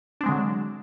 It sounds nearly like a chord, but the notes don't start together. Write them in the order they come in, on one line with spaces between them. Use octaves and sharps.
D4 C4 G#3 D3 F#3